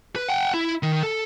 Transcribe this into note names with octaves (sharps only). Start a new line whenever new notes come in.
B4
F#5 G5
E4
D#3
A4